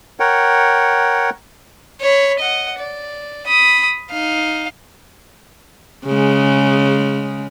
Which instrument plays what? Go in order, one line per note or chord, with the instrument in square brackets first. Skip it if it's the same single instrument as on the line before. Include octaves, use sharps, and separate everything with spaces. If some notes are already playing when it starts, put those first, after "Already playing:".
[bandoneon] A#4 C#5 F#5 G5
[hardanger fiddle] C#5 B5
D#5 F#5
D5
B5 D#6
D#4 F5
[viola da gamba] C#3 G#3